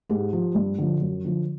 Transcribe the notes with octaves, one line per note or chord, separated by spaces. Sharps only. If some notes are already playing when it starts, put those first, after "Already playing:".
G#2 G4
F3
G2
D3 F3
F#2
D3 F3